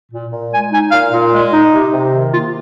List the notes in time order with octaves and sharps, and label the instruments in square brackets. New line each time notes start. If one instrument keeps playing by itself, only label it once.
[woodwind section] A#2
A#2
G#3 G#5
D#4 G#5
A#2 F5
A#2
G#3
D#4
C3
C3
D#3
A#3 F4